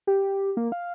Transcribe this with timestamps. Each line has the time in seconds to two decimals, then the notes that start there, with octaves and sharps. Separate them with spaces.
0.07 G4
0.57 A#3
0.72 F5